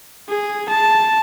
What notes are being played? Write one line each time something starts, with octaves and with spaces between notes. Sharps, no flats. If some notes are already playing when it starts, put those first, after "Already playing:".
G#4
A5